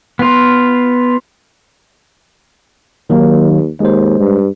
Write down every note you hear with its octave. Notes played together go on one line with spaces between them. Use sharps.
B3 F4
D#2 D#3 F#3 A#3
D#2 G#3 C5
G2